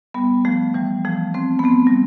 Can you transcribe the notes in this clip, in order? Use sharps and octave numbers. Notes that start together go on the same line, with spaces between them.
G3 B3
F3 A3
E3 G3
F3 A3
A3 C4
B3
A3 C4
G3